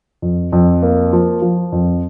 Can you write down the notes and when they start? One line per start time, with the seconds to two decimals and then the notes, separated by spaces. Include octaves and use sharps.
0.22 F2
0.52 F2
0.83 A#3
1.13 F3
1.42 F3
1.72 F2